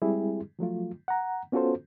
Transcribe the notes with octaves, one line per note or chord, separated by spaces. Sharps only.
G3 G#3 C4 E4 G4 G#4
F3 F#3 A3 F4
F#5 A#5
B3 C#4 F4 F#4 A4 C5